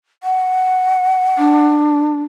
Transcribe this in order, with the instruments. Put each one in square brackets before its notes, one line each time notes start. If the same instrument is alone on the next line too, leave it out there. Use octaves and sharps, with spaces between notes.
[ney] F#5
[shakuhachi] D4